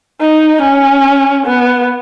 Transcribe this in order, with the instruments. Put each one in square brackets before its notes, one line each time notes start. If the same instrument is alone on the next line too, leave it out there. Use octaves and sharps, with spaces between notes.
[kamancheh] D#4
C#4
B3